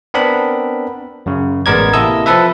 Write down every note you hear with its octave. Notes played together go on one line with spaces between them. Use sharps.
B3 C4 D4 A#4 B5
F#2 C#3
A1 G#3 B3 A#4 D5 G#6
C3 A#3 E4 A4 D#5 E6
F3 C4 A4 B4 E5